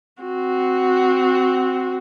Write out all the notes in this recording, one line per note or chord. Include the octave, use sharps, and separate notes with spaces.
C4 F#4